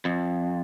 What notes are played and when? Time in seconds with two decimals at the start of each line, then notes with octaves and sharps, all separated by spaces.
0.05 F2